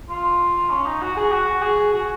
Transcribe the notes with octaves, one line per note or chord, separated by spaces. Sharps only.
F4
C#4
D#4
F#4
G#4
F#4
G#4
F#4